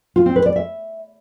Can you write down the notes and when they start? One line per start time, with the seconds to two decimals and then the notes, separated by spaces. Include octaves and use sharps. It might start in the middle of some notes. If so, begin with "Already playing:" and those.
0.16 F4
0.26 C4
0.36 B4
0.46 D5
0.56 E5